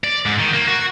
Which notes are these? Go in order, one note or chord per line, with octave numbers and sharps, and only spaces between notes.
D5
G#2
D#3
A#3
F#4